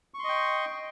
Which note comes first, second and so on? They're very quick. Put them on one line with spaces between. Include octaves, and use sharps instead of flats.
C#6 C6 D#5 G5